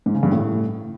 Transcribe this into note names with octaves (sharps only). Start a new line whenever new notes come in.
G#2
C#3
G2
A2